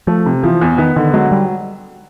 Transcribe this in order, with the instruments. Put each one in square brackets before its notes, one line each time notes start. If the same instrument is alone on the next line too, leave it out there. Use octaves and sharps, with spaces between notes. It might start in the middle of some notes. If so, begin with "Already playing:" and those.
[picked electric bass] F3 [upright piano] A3
[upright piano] C3
[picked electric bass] E3 [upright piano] F3
[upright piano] E2
[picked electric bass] D#3 [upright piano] B3
[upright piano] D3 [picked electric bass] D#3
[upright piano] F#3 [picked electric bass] G#3
[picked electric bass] G3